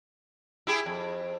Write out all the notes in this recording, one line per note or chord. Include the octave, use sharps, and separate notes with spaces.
E4 G4 G#4
F2